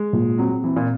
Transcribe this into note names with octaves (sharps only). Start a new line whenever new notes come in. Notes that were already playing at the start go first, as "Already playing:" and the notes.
Already playing: G#3
A#2
F#3 C4
E3 C4
A#2